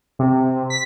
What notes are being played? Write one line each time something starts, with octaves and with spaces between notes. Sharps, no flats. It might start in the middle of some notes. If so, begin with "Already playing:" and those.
C3
B6